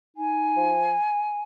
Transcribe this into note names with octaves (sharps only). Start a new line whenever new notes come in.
D#4 G#5
F3